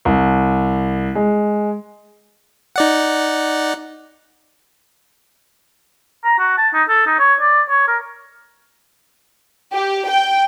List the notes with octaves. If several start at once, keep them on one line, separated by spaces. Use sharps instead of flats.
C2
G#3
D#4 D5 F#5
A#5
F#4
A5
D#4
A4
D#4
C#5
D5
C#5
A#4
G4
G5